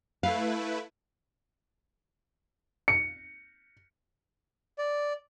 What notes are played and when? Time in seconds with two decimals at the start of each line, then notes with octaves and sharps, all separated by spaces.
0.23 A3 E4 B4 F5
2.88 C#7
4.78 D5